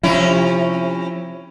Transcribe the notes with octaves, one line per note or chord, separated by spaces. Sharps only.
C3 F3 C#4 E4